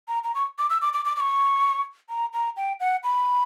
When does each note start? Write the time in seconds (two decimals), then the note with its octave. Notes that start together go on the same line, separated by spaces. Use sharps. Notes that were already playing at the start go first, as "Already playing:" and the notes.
0.08 A#5
0.24 A#5
0.35 C#6
0.58 D6
0.70 E6
0.82 D6
0.93 D6
1.05 D6
1.16 D6
1.20 C#6
2.09 A#5
2.33 A#5
2.57 G5
2.80 F#5
3.04 B5